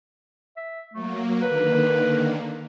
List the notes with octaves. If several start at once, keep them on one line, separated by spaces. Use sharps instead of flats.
E5
F#3 A3 A#3
D3 D#3 A#3 B4